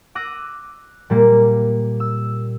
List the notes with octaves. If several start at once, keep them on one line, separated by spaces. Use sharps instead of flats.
D6 E6 F#6 A#6 D#7
A#2 G3 A#3
E6